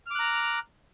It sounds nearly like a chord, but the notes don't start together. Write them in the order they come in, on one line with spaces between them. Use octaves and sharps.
F6 D6 F#6 A#5